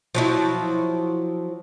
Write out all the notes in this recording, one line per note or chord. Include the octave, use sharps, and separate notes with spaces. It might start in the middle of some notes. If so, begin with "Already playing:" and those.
F3 F#3 E4